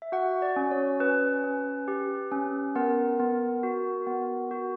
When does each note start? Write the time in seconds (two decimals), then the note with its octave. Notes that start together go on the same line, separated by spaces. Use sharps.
0.02 E5
0.12 F#4 F#5
0.42 D5
0.56 C#4
0.71 C#5
1.00 C#4 B4
1.44 C#4
1.88 G4
2.32 C#4
2.76 B3 A#4
3.20 B3
3.63 F#4
4.07 B3
4.51 F#4